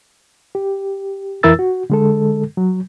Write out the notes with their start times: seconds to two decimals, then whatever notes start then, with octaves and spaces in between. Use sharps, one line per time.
0.55 G4
1.43 F2 E3 E4 A#4 E6 A6
1.59 F#4
1.90 D3 G#3 A4
2.57 F#3